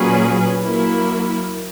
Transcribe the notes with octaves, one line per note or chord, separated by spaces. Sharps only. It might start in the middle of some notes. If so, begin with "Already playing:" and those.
Already playing: A#2 F#3 C#4 G#4 B4
F#3 A#3 E4